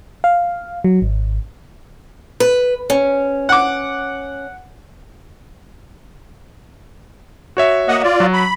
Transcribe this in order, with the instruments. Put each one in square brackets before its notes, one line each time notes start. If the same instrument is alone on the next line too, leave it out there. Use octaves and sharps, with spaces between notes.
[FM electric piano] F5
F#3
G#1
[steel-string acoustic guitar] B4
C#4
[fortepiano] F#5 D6
[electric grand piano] F#4 C#5 E5
[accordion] A#3 D#5 F#5
F4 D5
[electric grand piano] F#3
[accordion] B5